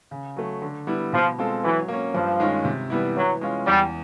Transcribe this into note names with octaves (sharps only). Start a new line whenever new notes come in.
C#3
F#3 A3
D3
G3 B3 E4
B2 F3
G#3 C4 F4 A4
E3 F#3
A#3 C#4
G2 F3
D#3 G#3 C#4 F4
C3
E3 G3 B3 E4
E3 F#3
G#3 C#4 F4
E2 G3